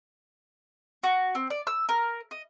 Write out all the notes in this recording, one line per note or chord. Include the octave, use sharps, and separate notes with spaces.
F#4
C4
D5
E6
A#4
D#5